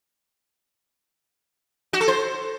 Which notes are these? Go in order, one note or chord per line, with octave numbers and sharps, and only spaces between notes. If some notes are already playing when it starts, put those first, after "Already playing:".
F#4
A4
C5